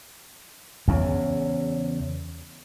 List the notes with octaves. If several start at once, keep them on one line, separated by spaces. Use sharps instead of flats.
E2 C#3